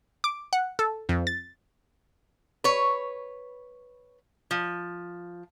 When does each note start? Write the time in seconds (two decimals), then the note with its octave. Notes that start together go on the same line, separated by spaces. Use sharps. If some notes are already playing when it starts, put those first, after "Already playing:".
0.24 D6
0.53 F#5
0.79 A4
1.09 F2
1.27 A6
2.64 B4 C#5
4.51 F3